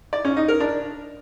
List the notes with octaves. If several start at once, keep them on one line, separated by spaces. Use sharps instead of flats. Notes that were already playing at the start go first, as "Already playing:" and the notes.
D5
C#4
D#4
A#4
D4